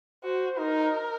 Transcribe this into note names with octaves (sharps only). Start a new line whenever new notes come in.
F#4 C5
D#4 A#4